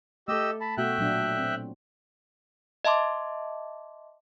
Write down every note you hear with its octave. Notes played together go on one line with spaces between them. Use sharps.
A3 G4 A4 D#5 E6
A5 B5
B2 A3 F#4 E5 G5 F#6
A#2 F#3 D4
C4
D#5 E5 A5 C6 D6